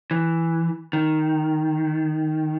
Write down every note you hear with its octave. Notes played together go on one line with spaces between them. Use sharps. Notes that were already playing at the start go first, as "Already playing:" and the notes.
E3
D#3